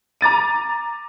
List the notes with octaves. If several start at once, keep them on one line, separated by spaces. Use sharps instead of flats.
A#5 D6 A6 D#7